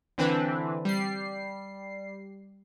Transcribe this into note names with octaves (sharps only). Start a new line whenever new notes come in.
D3 E3 C4 D4 B4
G3 C7